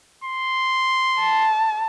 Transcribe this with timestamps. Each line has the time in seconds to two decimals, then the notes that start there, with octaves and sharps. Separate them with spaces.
0.24 C6
1.20 A5